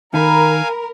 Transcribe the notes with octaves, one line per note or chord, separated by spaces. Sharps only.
D#3 A#4 F5 G#5 A#5 B5